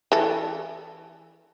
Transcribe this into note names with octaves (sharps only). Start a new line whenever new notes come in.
E3 A4